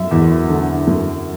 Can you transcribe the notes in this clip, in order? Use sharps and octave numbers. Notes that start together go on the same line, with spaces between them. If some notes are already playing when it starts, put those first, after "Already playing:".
Already playing: F#2 E5
E2
D3
F#2